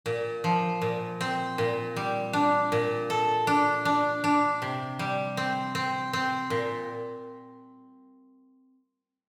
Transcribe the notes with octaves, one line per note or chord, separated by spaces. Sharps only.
A#2
F3
A#2
C4
A#2
G3
D4
A#2
A4
D4
D4
D4
C3
G3
C4
C4
C4
A#2